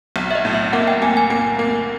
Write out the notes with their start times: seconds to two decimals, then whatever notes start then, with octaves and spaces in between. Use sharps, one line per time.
0.16 B1
0.31 E5
0.35 D#5
0.45 A2
0.54 E5
0.73 A#3 F#5
0.88 G5
1.02 A#3 G#5
1.17 G#5
1.30 A#3
1.59 A#3